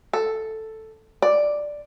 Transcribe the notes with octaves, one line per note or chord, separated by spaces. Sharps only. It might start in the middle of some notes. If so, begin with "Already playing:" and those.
A4
D5